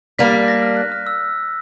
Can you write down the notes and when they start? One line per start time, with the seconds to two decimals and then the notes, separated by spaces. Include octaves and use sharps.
0.19 G3 A#3 D4 B6
0.33 B6
0.48 A#6
0.62 F6
0.77 F#6
0.92 F6
1.07 E6